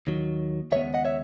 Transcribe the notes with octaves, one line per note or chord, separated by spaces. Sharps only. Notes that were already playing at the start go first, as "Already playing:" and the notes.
D#2 D#3 F#3
D#2 C#3 G#3 B3 C#5 E5
D#5 F#5
C#5 E5